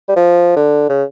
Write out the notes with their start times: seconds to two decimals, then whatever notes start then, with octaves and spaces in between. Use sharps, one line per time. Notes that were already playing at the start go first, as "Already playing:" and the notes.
0.08 G3
0.16 F3
0.57 D3
0.89 C#3